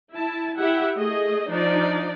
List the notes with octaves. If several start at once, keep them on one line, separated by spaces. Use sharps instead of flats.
E4 A5
E4 G4 E5 F#5
A3 G#4 D#5
F3 D4 D#4 D5